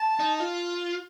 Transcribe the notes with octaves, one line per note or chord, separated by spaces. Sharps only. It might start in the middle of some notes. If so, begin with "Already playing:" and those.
Already playing: A5
D#4
F4